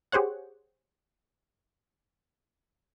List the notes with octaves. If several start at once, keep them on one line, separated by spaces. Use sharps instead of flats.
G4 G#4 C5 C#5 F#5